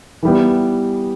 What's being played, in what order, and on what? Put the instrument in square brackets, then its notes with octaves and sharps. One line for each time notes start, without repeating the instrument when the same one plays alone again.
[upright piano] E3 G3 B3